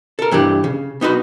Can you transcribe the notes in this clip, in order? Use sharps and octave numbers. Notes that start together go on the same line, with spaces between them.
A4 A#4
G2 E3 D4 G4
C#3
B3 D#4 F#4 B4